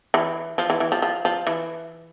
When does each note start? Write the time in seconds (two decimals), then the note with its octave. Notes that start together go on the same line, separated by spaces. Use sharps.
0.14 E3
0.58 F3
0.70 E3
0.80 E3
0.92 F3
1.02 F3
1.25 F3
1.47 E3